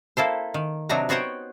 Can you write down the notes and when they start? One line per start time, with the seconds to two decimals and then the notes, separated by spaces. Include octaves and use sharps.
0.17 A#3 E4 A4 C5
0.54 D#3
0.89 C3 F#3 D4 D#4 F#4 A#5
1.09 B3 F#4 C5 C#5 F#5 G5